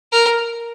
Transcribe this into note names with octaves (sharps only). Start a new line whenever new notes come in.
A#4